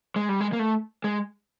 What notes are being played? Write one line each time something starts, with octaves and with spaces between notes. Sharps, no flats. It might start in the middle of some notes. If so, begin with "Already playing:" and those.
G#3
G3
G#3
A#3
A3
G#3